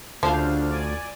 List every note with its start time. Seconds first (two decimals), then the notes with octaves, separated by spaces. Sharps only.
0.23 D2 C#3 F3 D4 C5 F5
0.70 D5 G#5